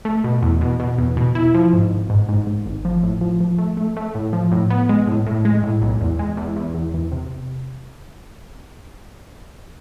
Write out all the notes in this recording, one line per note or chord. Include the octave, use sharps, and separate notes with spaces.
A3
B2
E2
B2
B2
E2
B2
E4
F3
G#2
G#1
G#2
G#2
G#2
G#1
F3
A2
F3
F3
A3
A3
A3
A2
F3
A2
B3
G#3
A2
A2
G#3
A2
B1
E2
G#3
E2
E2
E2
E2
C3